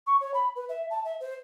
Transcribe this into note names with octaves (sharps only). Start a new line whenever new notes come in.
C#6
C#5
B5
B4
E5
A5
E5
C5